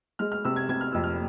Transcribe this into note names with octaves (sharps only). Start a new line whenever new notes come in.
G#3 F6
F6
C3 E6
G#6
C3 G#6
F6
F2 E6
F6